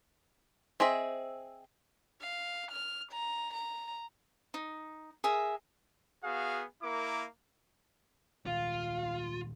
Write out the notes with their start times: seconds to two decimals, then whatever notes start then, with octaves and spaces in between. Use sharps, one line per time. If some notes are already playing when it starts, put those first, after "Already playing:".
0.80 C4 G#4 D#5 E5
2.21 F5
2.72 F6
3.12 A#5
3.54 A#5
4.54 D#4
5.24 G#4 A#4 E5 A#5
6.24 B3 F#4 G#4 F5
6.82 A#3 E4 A#4 D6
8.46 A#2 D#3 G#3 F4 F5